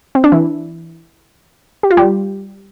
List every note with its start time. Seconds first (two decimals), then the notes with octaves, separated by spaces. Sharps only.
0.15 C4
0.24 D4
0.32 E3 E4
1.83 G4
1.91 F4
1.97 G3 G4